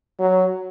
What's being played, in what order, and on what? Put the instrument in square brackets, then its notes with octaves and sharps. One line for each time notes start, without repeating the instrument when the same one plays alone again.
[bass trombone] F#3